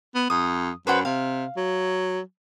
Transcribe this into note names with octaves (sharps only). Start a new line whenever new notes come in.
B3
F2 D#6
F#2 B4 C5 F#5
C3 F5
F#3